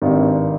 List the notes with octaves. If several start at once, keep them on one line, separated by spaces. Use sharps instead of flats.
G#1 G2 D#3